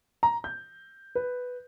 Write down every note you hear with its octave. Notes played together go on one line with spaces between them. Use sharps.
A#5
G6
B4